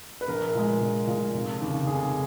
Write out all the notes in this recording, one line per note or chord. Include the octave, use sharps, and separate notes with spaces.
B4
A#1 A#4
A#2 G#3
A#1
A#2 G#3
F1
D#2 C#3
F1 G#4